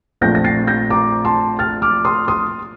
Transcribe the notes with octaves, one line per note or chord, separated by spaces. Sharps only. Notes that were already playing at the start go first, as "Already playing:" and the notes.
A#1 A#2 A3 C4 G6 A#6
A#6
A6 C7
G6 A#6
A#5 D6
A5 C6
F6 A6
D6 F6
C6 D#6
C6 D#6